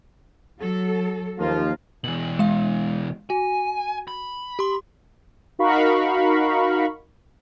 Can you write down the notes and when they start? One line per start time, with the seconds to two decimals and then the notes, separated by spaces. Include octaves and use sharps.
0.58 F#3 A4
1.39 D#2 F3 A#3 F4
2.04 B2 E3 F#7
2.39 G#3 F5
3.30 F#4 G#5
4.08 B5
4.59 G4 C6
5.59 D#4 F#4 A#4 F5 B5 C#6